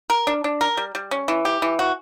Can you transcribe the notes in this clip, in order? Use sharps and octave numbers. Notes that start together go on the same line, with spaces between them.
A#4
D4
D4
A#4
G3
G3
C#4
E3
G4
E3
F#4